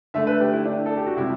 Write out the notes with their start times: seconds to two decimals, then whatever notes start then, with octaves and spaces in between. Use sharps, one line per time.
0.14 D3 A3 E5
0.27 B4
0.41 G4
0.53 E4
0.65 D4
0.86 A4
0.97 G4
1.06 F#4
1.17 C3 G3 E4